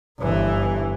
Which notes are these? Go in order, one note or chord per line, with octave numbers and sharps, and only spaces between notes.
G1 E3